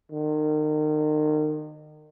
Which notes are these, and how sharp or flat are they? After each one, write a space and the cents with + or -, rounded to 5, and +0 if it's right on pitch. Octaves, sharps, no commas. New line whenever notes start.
D#3 -35